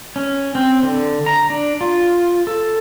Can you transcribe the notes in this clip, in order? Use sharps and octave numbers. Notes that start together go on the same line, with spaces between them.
C#4
C4
D3
A#5
D4
F4
A4